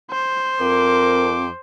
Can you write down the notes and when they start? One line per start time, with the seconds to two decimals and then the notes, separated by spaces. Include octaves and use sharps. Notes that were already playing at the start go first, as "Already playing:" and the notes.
0.11 C5
0.61 F2 A#4 D6